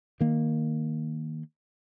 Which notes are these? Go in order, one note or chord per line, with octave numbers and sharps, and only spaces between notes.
D#3 A#3